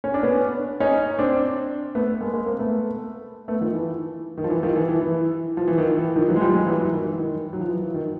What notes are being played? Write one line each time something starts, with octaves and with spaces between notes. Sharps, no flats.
C#4
D4
B3 C#4
C#4 D#4
C4 D4
A3 B3
G#3 A#3
G#3 A#3
A#3 C4
A3 B3
A3 B3
D#3 F3
E3
D#3
F3
E3
D#3 F3
E3
E3
E3
F3
E3
D#3
E3
D#3 F3
E3 F#3
G#3
F3 G3
F#3 G#3
E3 F#3
E3
D#3
E3
D#3
F#3
F3
E3
E3
D#3